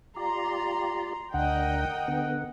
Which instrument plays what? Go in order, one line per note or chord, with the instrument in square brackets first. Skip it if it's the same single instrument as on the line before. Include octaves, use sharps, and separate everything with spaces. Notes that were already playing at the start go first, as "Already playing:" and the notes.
[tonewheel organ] F4 G4 D5 [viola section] A#5 C6
[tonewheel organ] D2 D4 [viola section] A#4 D#5 G5 [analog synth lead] F#5
[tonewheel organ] D3 B3